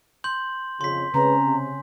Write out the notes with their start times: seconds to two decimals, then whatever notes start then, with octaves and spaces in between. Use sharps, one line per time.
0.24 C6 G6 F#7
0.81 F2 C#3 C6 B6
1.14 C#3 G#3 C4 C#4 B4 A#5
1.44 C3